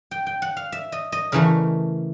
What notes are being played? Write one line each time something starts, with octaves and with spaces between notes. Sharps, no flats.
G5
G5
F#5
F5
E5
D#5
D#5
C#3 E3 A3 A#4